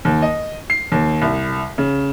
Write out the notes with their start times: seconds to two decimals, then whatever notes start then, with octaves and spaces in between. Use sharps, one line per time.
0.05 D#2
0.22 D#5
0.70 C7
0.92 D#2
1.22 C2
1.78 C#3